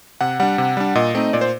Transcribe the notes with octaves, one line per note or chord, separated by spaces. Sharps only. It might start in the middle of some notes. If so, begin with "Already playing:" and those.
C3 F#5
G3 D4 F#5
C3
G3 D4
A#2 D#5
A3 C4 D#4
A#2 D5
C5